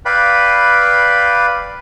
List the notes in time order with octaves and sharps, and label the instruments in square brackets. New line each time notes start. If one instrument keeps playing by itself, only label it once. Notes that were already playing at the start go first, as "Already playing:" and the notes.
[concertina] B4 D5 F5 G5 B5